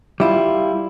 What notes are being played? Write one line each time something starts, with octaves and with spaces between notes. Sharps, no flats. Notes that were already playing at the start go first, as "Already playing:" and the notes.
G3 E4 F4